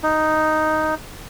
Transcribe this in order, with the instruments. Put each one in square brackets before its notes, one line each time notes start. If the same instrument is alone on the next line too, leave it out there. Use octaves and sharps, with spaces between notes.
[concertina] D#4